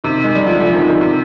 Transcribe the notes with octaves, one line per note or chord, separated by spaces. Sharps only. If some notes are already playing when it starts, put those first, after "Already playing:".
C3 D#3
G#3
G3
D3 F3
D3 F3
C3 D#3
C3 D#3
C3